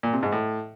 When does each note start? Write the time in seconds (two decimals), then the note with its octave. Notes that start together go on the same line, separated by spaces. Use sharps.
0.03 A#2
0.13 C3
0.23 G#2
0.32 A2